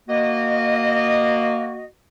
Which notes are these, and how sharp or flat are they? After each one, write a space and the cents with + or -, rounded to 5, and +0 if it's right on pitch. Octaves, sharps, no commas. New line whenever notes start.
A#3 -5 F#4 +0 D#5 -20